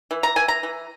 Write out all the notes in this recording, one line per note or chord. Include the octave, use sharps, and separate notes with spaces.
E3
A#5
E3 G#5
A#5
E3